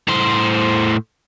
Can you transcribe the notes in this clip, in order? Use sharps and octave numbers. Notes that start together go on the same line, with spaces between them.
A2 C5